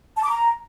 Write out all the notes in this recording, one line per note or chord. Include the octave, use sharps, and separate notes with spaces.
A5
D6
A#5